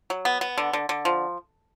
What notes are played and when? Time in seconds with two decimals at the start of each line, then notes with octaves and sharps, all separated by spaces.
0.10 F#3
0.25 B3
0.41 B3
0.58 D3
0.73 D3
0.89 D3
1.05 F3